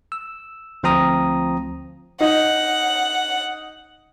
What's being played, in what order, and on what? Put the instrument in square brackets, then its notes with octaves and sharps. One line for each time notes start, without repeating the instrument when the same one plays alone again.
[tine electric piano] E6
D2 F3 C4 F4 A#5 D#6
[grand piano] D#4 [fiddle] F#5